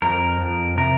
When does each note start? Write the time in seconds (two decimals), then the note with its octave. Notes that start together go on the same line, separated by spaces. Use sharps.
0.02 F2 A#4
0.41 F2
0.77 C3 A#4